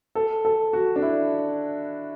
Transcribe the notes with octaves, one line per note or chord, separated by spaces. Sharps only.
A4
A4
F#4
D4
E4